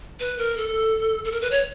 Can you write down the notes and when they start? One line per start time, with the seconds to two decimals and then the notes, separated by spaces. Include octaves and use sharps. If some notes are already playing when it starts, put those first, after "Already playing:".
0.20 B4
0.38 A#4
0.57 A4
1.24 A4
1.32 A#4
1.41 B4
1.51 C#5